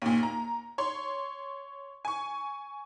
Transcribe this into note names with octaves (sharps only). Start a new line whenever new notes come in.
D#2 A#2
A#5
C#5 C6
G#5 C#6